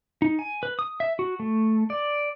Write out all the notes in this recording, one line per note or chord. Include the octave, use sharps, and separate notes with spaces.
D#4
G#5
B4
D#6
E5
F#4
A3
D5